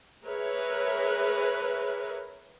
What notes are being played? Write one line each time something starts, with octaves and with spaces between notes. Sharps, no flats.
G#4 A#4 B4 C#5 E5